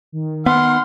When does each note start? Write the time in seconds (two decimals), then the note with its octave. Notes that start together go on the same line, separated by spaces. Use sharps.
0.12 D#3
0.46 B3 F#5 C6 F6